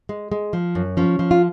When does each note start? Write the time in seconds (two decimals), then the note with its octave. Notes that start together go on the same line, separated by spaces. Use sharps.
0.09 G#3
0.32 G#3
0.53 F3
0.75 F#2
0.97 F3 C#4
1.19 F3
1.31 F4